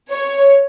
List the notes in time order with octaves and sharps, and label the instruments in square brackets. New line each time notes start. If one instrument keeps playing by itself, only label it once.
[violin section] C#5